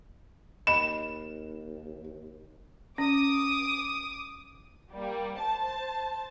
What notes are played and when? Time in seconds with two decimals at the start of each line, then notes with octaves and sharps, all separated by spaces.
0.67 D#2 D#5 B5 E7
2.98 C#4 D6 D#6
4.93 G3 A#3
5.39 C5 A5